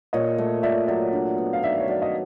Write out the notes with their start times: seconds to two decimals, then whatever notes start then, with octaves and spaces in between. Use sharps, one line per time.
0.13 A#2 C#5 D#5
0.38 A3
0.63 A#2 D5 E5
0.88 F#3 D5 E5
1.13 D4
1.38 B3
1.53 F5
1.63 D#3 D5 E5
1.80 C#5
1.88 F#3 D5
2.02 D#5